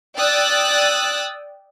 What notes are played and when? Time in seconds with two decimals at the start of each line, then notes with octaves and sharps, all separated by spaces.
0.16 D5 G5 D#6 E6 F#6 A6